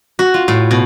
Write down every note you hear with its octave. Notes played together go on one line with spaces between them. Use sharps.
F#4
F4
A2
B2